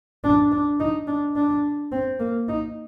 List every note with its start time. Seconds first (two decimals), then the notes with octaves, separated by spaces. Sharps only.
0.24 D4
0.52 D4
0.80 D#4
1.08 D4
1.36 D4
1.92 C4
2.20 A#3
2.49 D#4